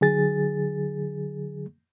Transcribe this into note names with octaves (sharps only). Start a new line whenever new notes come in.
D3 F#3 G#4 A6